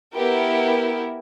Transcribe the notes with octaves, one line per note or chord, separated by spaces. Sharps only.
B3 E4 G4 A#4